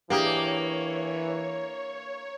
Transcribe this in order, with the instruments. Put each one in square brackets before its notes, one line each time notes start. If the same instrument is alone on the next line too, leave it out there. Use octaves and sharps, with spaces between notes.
[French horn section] E3 [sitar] A#3 [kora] D4 G4 G#4 [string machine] C#5